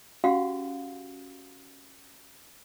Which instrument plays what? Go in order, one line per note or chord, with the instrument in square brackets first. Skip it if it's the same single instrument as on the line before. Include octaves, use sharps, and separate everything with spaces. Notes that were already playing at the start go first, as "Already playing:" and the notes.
[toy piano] C#4 F#4 G4 F5 F#5 C6